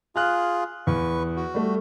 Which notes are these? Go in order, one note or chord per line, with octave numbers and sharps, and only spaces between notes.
F4 G#4 F6 F#6
E2 B4 C#6
F#4
G3 A3